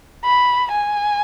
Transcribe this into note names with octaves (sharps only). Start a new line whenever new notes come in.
B5
G#5